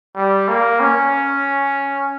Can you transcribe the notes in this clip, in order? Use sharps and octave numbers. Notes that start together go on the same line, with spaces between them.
G3
A#3
C#4